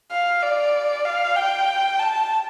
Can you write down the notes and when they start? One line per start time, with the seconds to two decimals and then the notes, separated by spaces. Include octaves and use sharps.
0.12 F5
0.43 D5
1.05 F5
1.36 G5
1.99 A5